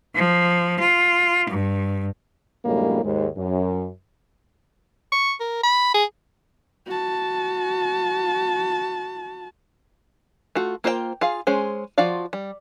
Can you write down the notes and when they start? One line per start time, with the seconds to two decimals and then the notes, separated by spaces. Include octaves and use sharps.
0.14 F3
0.80 F4
1.50 G2
2.65 F#2 A2 D3 G3 G#3 A#3
3.03 D#2 G#2 G#3
3.37 F#2
5.12 C#6
5.40 A#4
5.63 B5
5.94 G#4
6.86 F#4 A5
10.55 A3 F4 F#4
10.84 A#3 F4 C5 D5 G5
11.21 F4 G#4 F5
11.47 G#3 C#4 G#4 C5
11.98 F3 F4 F#4 D5 F5
12.33 G3